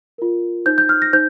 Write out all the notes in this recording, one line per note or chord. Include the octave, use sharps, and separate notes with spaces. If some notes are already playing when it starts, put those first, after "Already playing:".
F4 A#4
D#4 C5 G6
G6
F6
A#6
D#4 C5 G6